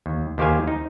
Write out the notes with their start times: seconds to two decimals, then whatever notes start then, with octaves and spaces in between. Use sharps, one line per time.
0.06 D#2
0.38 D#2 D#3 G4 C5 F5 G#5
0.68 D#4